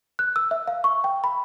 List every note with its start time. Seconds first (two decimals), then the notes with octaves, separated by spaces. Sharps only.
0.19 F#6
0.36 E6
0.51 E5
0.68 F5
0.84 C#6
1.04 G5
1.24 B5